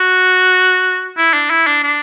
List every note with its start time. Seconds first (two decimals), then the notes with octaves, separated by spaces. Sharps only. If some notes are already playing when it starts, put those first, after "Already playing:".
Already playing: F#4
1.17 E4
1.34 D4
1.50 E4
1.67 D4
1.84 D4